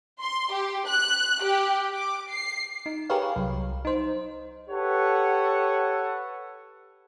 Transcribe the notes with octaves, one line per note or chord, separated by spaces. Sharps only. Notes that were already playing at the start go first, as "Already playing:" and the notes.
C6
G4
F#6
G4
D6
C7
D#4
G4 G#4 A#4 B4 C#5 F5
C2 F#3
D#4 C5
G4 A4 B4 C#5 F#5